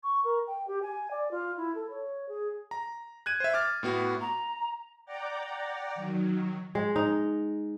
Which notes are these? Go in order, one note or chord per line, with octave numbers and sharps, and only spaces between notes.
C#6
A#4
G5
G4
G#5
D5
F4
E4
A4
C#5
G#4
A#5
F#6 G#6 D#7
C5 E5
D6 F6 A6
A2 B3 F#4
A#5
D5 F#5 G5 A#5 D6
D#3 F#3
G#3
D#4